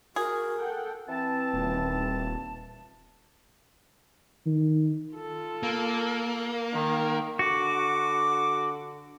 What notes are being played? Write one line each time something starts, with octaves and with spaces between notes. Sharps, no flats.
F#4 G#4 A#4
A4 F#5 G5
E3 C4 A5
D#1
D#3
F4 A4
A#3
D#3
D3 F#4 D6